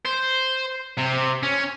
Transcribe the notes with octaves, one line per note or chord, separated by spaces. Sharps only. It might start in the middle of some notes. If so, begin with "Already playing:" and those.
C5
C3
C#4